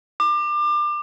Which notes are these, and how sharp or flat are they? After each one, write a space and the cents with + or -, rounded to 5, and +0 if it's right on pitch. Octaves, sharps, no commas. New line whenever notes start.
D6 +30